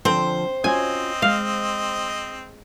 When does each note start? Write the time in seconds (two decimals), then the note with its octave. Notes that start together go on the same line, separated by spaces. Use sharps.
0.05 D3 F3 C4 A4 C5
0.64 C4 C#4 F4 F#4 D#5 G#5
1.22 G#3 F5